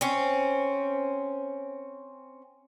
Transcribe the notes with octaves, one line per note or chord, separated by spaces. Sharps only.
C4 C#4